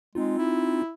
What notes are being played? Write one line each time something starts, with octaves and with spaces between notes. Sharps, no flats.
G#3 C4 D#4 F4
E4